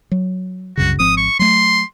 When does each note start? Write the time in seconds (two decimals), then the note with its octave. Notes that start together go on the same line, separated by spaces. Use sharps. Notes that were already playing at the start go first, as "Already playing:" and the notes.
0.12 F#3
0.77 C2 F#2 C#3 F#4
0.99 G#1 F3 C4 D#6
1.17 C#6
1.39 F#3 A3 C6